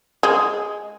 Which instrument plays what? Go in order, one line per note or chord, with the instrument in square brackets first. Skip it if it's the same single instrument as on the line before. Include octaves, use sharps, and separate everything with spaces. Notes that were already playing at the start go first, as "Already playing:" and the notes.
[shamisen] G#3